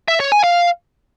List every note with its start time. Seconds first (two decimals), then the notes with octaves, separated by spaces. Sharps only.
0.08 E5
0.20 C#5
0.32 G#5
0.44 F5